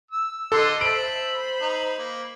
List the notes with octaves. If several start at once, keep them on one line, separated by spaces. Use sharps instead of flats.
E6
D3 A4 D#5 C6
C5 E5 A5 B5 D7
D#4
A#3